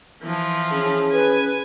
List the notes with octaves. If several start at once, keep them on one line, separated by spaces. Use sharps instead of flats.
E3 F3
C#4 G#4
B4 G#5